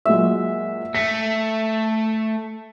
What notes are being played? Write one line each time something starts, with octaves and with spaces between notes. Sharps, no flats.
A#2 F#3 G#3 E5
A3 B6